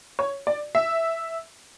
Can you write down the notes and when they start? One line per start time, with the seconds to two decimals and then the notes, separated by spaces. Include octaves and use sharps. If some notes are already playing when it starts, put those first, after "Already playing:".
0.19 C#5
0.47 D5
0.75 E5